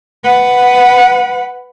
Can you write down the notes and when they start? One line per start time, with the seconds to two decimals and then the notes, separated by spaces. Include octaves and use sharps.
0.24 B4 F#5